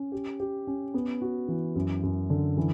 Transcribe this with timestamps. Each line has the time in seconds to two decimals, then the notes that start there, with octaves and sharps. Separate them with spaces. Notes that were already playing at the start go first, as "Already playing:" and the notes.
Already playing: C#4
0.12 G4
0.40 G4
0.67 C#4
0.94 B3
1.22 F#4
1.48 E3
1.75 F#2
2.03 F#2
2.30 D3
2.57 E3